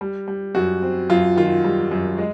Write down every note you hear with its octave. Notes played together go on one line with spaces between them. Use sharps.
G3
G3
F#2 F#4
C4
F#2 F4
D#3 F4
G3
F#2
G#3